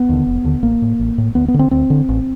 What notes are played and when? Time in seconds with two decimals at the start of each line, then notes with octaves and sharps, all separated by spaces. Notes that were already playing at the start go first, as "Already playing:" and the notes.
Already playing: B3
0.09 D#2 D3
0.27 F1
0.44 D#2 D3
0.63 A1 A#3
0.82 A2
0.99 A1
1.18 A2
1.35 D2 B3
1.48 B3
1.54 D3
1.59 C4
1.71 D2 C4
1.90 D3
2.09 A1